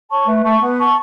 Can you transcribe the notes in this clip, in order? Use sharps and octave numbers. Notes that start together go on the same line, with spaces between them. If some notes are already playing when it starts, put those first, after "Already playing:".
C#5 A5 C#6
A3 B4
A3 A5 C#6
B3 B4
A5 C#6